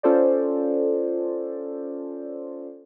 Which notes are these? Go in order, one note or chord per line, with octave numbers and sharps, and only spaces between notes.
C#4 F4 A4 C5 D5